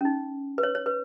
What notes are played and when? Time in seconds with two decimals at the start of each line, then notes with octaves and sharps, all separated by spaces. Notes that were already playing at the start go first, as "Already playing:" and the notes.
0.01 C#4
0.05 D#4
0.58 B4
0.63 C#5
0.75 C#5
0.86 B4